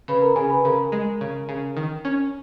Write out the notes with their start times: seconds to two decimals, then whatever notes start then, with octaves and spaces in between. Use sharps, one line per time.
0.08 C#3 B4 B5
0.22 A#4 A#5
0.36 C#3 G#4 G#5
0.50 B4 B5
0.64 C#3 A#4 A#5
0.92 G#3
1.21 C#3
1.49 C#3
1.77 D#3
2.05 C#4